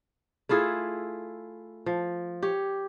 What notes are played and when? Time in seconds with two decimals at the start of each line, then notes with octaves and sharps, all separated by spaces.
0.49 A3 E4 F4 G#4
1.86 F3
2.43 G4 C#5